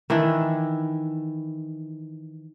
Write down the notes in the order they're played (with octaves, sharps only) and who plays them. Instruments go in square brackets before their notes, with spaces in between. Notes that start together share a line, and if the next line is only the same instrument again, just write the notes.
[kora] D#3 E3 D4 E4